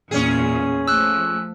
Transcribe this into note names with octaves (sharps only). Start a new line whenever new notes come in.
E2 A#2 C#4 G#4
F3 A3 E6 F#6